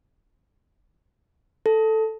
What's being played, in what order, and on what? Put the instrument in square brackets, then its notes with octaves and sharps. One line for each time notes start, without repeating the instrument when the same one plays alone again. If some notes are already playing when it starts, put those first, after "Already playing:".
[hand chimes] A4